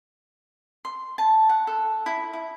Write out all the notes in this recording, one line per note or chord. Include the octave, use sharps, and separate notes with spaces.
C6
A5
F#5
A4
E4
E4